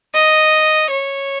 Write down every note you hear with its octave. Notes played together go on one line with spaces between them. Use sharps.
D#5
C#5